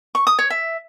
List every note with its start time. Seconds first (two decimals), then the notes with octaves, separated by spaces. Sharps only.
0.15 C#6
0.27 D#6
0.39 C#5
0.50 E5